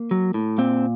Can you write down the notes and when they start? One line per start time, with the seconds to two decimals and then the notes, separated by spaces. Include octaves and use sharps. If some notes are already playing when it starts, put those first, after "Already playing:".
Already playing: A#3
0.11 F#3
0.34 A2
0.58 A#2 C4